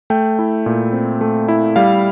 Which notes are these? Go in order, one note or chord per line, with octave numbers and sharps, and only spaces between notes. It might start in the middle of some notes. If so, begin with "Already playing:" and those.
A3 G5
E4
A#2
C4
A3
E4
G3 F5